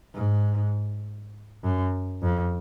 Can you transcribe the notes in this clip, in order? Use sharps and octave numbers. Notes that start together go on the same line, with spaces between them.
G#2
F#2
F2